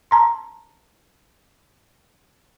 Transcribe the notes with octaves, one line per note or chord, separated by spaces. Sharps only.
A5 A#5 C6